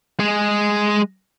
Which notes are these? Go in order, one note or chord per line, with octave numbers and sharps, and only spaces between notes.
G#3 G#4